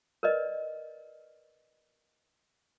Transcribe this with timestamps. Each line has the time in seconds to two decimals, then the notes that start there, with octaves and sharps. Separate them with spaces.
0.23 A#4 B4 D5 D#5